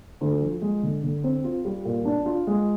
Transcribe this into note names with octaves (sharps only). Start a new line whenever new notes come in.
D2
F3
G#3
D3
D3
C4
F4
G3
A#2
D4
F4
G#3